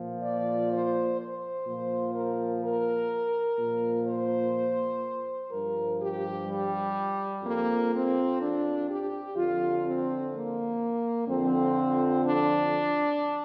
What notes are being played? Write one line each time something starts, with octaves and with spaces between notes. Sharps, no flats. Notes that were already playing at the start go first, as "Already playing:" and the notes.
Already playing: A#2 F3
D5
C5
C5
A#2 F3
A#4
A#4
A#2 F3
C5
G2 F3 A#4
G4
G3
F2 F3 A#3
C4
D4
G4
F2 D3 F3 F4
C4
A#3
F2 D3 F3 C4
D4